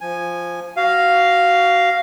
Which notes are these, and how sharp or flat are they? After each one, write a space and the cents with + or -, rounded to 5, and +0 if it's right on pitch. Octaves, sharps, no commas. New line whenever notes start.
F3 +0 G#5 +0
F#4 +20 F5 -5